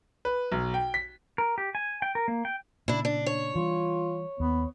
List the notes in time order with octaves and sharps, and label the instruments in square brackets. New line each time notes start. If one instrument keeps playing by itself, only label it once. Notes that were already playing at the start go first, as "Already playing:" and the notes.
[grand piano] B4
B1
G5
B6
[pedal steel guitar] A#4
G4
G#5
G5
A#4
A#3
G5
[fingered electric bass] A#2 C#3 [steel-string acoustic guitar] D4 E4
[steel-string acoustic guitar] D4
C#5
[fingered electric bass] E3 G3 [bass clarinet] F4
[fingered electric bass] D#2 [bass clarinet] B3